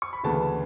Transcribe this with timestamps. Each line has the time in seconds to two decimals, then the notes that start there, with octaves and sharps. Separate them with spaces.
0.02 C#6
0.13 B5
0.23 D2 C#3 E3 B3 A5